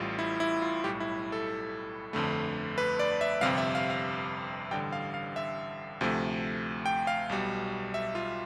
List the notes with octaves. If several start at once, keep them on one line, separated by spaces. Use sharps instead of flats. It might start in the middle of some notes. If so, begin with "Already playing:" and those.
Already playing: A1 A2 G3 F4
E4
E4
F4
B1 A2 G3 G4
E4
A4
G1 F2 D3 A3
B4
D5
E5
G1 F2 C3 G3 F5
E5
F5
F5
A1 G2 D3 G3 G5
F5
F5
E5
D2 C3 F3 A3
G5
F5
B1 B2 G3
E5
F4